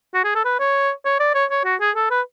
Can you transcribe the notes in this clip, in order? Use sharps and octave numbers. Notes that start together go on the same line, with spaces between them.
F#4
G#4
A4
B4
C#5
C#5
D5
C#5
C#5
F#4
G#4
A4
B4